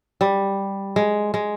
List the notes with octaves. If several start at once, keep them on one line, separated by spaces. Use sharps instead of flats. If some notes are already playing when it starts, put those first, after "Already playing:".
G3
G#3
G#3